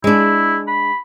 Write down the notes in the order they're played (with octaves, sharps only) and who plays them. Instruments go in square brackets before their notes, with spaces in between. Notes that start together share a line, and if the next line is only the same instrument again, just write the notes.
[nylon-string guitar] G#3 D4 [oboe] E4
[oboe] B5